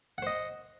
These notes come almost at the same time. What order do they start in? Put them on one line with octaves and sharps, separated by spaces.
F#5 C5 D#5